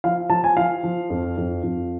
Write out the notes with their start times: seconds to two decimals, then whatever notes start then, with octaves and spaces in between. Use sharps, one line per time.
0.04 F3 F5
0.30 F3 A5
0.44 G#5
0.57 F3 F5
0.83 F3
1.10 F2
1.37 F2
1.63 F2